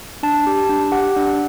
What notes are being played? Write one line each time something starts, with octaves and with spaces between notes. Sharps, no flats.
D4 A5
G4 A5
D4
G4 F#5
D4